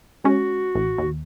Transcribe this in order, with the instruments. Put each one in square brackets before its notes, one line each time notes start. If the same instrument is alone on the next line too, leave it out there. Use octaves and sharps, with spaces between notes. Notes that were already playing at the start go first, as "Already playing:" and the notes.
[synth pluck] G#3 C#4 [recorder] F#4
[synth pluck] A1
D#2